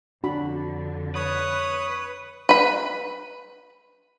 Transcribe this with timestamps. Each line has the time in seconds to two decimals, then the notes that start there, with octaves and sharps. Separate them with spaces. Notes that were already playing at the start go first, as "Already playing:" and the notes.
0.24 F2 D3 D4 F#4 B5
1.15 B4 C#5 D#6
2.49 B4 B5